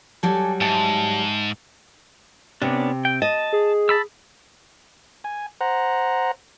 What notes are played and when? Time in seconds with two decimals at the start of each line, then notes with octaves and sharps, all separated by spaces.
0.23 F#3 G3 A4 C#5 D5 G#5
0.61 G#2 E5 G#5 A5
2.62 C3 B3 C#4 D4
3.05 G5
3.22 D#5 A5
3.53 G#4
3.89 A5 B5 E6
5.24 G#5
5.61 C5 F#5 A#5